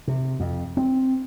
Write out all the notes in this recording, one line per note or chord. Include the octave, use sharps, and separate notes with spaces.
C3
F2
C4